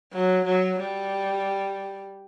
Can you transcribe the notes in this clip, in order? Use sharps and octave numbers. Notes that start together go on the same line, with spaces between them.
F#3
F#3
G3